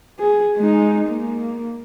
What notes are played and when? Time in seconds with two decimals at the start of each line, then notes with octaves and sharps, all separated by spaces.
0.19 G#4
0.57 G#3 D#4
1.08 A#3